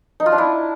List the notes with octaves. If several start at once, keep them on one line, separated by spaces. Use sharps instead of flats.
D#4
F4
D4
E4